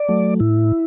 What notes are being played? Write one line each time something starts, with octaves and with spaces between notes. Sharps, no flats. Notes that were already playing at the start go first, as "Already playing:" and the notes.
Already playing: D5
F#3 A3
A2 E4